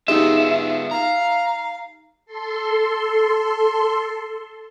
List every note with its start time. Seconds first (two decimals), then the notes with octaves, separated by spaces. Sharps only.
0.08 B3 D#4 F4 G4 G#4 D#5 E5
0.91 F5 A#5
2.26 A4 C6